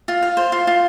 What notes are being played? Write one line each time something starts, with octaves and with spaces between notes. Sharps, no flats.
F4
F5
C5
F4
F4